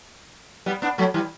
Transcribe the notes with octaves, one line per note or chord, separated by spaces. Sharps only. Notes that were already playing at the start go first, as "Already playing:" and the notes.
G3 B3
B3 D4
F#3 A3
E3 G3